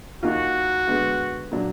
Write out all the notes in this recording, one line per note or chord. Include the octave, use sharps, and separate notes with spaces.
D#2 D#3 A#3 F4 F#4
D3 G#3 B3
A#2 F#3 D4